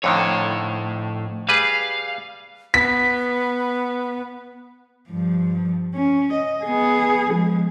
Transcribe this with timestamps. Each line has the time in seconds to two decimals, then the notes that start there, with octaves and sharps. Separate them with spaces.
0.04 F2 A2 D3 D#3 C#5
1.49 G3 G#4 B4 F5
2.74 B3 B6
5.10 G2 F3
5.94 C#4
6.33 D#5
6.63 B3 G#4
7.32 F3 G#3